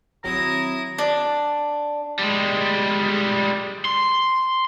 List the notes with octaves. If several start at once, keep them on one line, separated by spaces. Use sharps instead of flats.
D#3 F#3 C4 E4 A#5 D#6
D4
G3 G#3
C6